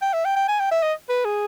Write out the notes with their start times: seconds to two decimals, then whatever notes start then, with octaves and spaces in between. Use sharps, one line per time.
0.02 G5
0.13 E5
0.25 G5
0.36 G5
0.48 G#5
0.60 G5
0.71 E5
0.83 D#5
1.09 B4
1.25 G#4